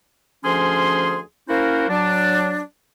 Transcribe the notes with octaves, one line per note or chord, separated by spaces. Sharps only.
D2 F3 C#4 G#4 C6
A#3 C#4 E4 F#4 A#4 C5
F#3 D4